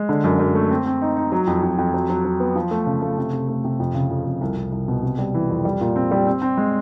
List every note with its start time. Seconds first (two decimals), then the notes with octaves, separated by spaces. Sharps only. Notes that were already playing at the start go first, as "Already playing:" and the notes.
Already playing: G#3
0.09 D3
0.24 F#2
0.39 F#2
0.55 A3
0.71 C4
0.86 C4
1.02 D#4
1.17 D#4
1.32 F#3
1.47 F2
1.63 F2
1.78 F2
1.94 F#3
2.10 F#3
2.25 F#3
2.40 B3
2.56 F3
2.71 A3
2.86 C#3
3.02 A3
3.18 C3
3.33 C3
3.48 A3
3.64 C3
3.80 F2
3.95 C#3
4.10 F2
4.26 F2
4.41 C2
4.56 C2
4.72 C2
4.88 B2
5.03 C3
5.18 G3
5.34 E3
5.50 F2
5.65 G3
5.81 A#2
5.96 C4
6.11 G3
6.27 C4
6.42 C4
6.58 G#3